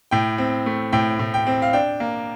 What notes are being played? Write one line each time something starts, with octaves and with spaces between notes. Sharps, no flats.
A2 G5
C4
A3
A2 G5
A2
G5
C4
F5
D4 G5
A#3